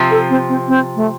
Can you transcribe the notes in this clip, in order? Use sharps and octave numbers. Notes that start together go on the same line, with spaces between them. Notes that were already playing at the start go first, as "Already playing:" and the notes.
Already playing: C3 F3
A4
C4
C4
C4
A3